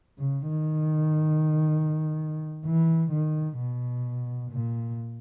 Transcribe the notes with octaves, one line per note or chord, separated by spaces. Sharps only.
C#3
D#3
E3
D#3
B2
A#2